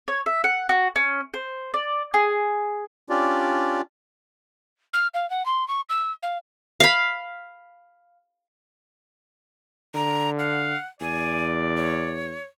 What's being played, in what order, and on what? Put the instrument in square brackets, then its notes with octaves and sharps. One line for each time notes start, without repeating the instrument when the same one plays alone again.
[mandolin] C#5
E5
F#5
F#4
C#4
C5
D5
G#4
[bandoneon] C#4 D4 F4 G4 D5
[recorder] F6
F5
F#5
C6
C#6
E6
F5
[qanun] F5 B5
[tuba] D3 [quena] A#5
[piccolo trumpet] F5 [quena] F#5
[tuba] E2 [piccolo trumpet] D5 [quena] G#5
[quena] C#5